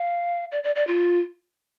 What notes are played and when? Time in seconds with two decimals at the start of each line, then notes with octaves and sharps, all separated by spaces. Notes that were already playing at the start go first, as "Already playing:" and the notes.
Already playing: F5
0.52 D5
0.64 D5
0.76 D5
0.87 F4